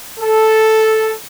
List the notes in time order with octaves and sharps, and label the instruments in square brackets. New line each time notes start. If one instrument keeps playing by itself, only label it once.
[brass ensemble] A4